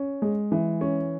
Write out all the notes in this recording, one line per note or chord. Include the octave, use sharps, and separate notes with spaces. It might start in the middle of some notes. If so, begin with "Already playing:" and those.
Already playing: C#4
G#3
E3
C#4